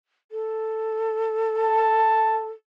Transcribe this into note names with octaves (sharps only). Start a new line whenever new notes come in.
A4
A5